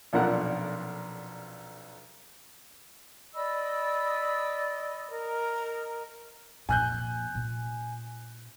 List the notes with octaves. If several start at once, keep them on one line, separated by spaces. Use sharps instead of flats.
B1 F2 A#2 D4 A#4 F#5
D5 D#5 B5 E6
A#4 D#5
F2 A#2 G#5 F#6 G6
A#2 C#4